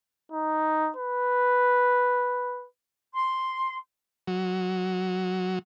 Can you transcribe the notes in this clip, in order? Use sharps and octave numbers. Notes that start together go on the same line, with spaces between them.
D#4
B4
C6
F#3